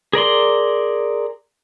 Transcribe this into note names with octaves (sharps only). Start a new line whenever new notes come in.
G#4 A#4 D5 C6